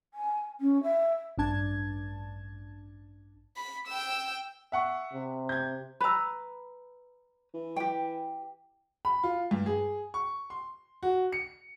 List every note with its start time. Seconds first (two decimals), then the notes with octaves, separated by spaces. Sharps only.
0.14 G#5
0.60 C#4
0.83 E5
1.38 A1 G2 D4 A5 G#6
3.57 B5
3.87 G5 E6
4.72 E5 F#5 C#6
5.13 C3
5.49 G6 G#6
6.01 B4 A#5 B5 E6
7.54 E3
7.76 G4 G5
9.05 B5
9.24 F4
9.51 G2
9.66 G#4
10.14 C#6
10.50 C6
11.03 F#4
11.32 C#7